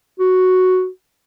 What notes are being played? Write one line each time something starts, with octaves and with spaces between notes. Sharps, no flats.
F#4